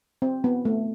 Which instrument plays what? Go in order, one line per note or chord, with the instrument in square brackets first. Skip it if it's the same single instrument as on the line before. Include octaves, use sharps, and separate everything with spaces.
[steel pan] C4
B3
A3